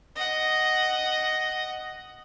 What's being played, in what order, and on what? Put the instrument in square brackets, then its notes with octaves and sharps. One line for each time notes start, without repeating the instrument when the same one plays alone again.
[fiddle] D#5 F#5